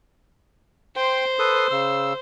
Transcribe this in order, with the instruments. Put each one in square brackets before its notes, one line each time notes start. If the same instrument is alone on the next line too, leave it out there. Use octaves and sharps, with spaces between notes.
[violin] C5 [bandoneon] G5 C6
[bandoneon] A4 B4 D#6
C#3 E6